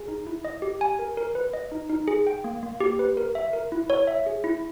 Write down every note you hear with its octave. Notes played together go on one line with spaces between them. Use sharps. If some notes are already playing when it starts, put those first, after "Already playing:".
Already playing: G#4
D#4
E4
D#5
G4
G#5
A#4
A#4
B4
D#5
D#4
D#4
G#4
G5
A#3
A#3
G4
B4
A#4
E5
A#4
E4
C#5
E5
G#4
E4